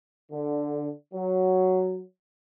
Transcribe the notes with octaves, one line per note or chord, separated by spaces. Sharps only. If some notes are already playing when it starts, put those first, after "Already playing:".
D3
F#3